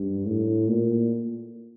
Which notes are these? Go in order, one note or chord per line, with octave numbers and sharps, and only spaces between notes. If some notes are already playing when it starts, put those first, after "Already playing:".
Already playing: G2
A2
A#2